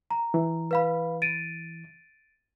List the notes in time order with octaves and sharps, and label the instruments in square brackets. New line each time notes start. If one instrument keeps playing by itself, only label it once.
[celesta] A#5
[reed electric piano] E3
[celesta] B4 F5 B5
A6 D7 D#7